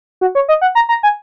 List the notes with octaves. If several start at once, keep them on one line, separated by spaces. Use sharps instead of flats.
F#4
C#5
D#5
F#5
A#5
A#5
G#5